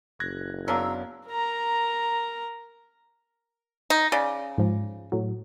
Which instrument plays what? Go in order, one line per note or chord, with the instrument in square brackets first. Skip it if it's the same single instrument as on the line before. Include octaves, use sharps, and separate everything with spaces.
[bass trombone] F#1 [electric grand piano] F#6 G#6 A#6
[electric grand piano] F#2 B3 F5 [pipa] C#4 D4 A#4 [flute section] A#5 E6
[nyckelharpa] A#4 A#5
[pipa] D#4
[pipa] C#3 [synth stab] D5
[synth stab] G#2 F3
A2 F#3